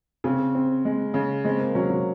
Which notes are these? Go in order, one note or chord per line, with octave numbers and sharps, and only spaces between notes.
C#3 C4
C4
G#3
C#3
G#3 C4
A#3
F#3 C#4
F#3